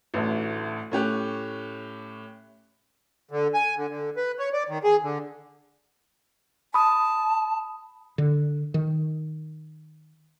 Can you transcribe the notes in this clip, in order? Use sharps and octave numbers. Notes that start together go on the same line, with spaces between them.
A1 D2
A2 C#4 G4 F#6
D3
G#5
D3
D3
B4
C#5
D5
D#3
G#4
D3
A5 B5 D#6
D3
D#3